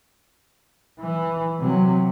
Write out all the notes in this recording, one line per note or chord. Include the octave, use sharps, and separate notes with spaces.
E3
C3 F#3